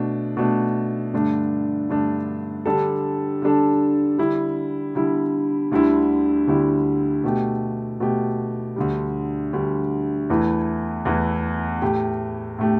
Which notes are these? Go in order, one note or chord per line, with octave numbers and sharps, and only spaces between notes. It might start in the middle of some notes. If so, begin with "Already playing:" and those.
Already playing: B2 A3 D4
B2 A3 D4
G2 D3 A3 D4
G2 D3 A3 D4
D3 G3 D4 A4
D3 G3 D4 A4
D3 G3 E4
D3 G3 E4
D2 D3 G3 E4
D2 D3 G3 E4
B2 A3 G4
B2 A3 G4
D2 D3 G3
D2 D3 G3
E2 E3 A3 E4
E2 E3 A3 E4
A2 A3 G4
A2 A3 G4